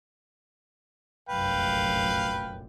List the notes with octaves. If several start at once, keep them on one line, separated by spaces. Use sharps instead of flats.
F1 A#1 F#2 B4 F5 G5